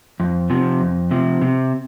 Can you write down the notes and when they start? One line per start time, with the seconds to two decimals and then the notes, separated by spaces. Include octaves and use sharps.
0.20 F2
0.50 C3 F3
0.81 F2
1.11 C3 F3
1.42 C3